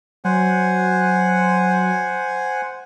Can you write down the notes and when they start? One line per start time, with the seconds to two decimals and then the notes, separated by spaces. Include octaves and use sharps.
0.25 F#3 C5 F#5 G#5